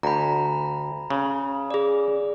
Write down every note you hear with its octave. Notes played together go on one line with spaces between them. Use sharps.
D2 A#5 B5
C#3
G#4 D5